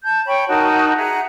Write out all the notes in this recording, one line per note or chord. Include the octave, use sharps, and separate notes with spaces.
A5 G6
C#5 G5 B5 C#6
D#4 F#4 A#4 A5
G#4 E5 F#5 A#5